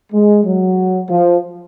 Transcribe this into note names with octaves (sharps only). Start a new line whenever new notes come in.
G#3
F#3
F3